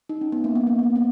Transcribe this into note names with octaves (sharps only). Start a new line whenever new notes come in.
D#4
C#4
B3
A#3
B3
A#3
B3
C4